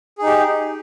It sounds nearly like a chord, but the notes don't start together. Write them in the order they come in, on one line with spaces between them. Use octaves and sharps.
G#4 D#4 G4